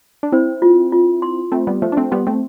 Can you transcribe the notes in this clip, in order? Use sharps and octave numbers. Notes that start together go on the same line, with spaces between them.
D4
C4 E4 C5
F4
F4
C6
A3 C4 F4
G3 B3
F3 A3 C5
D4
A3 C4
G3 B3 C6
A3 C4